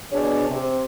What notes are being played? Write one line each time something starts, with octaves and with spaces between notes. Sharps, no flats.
B2 D4 G#4 C#5
C3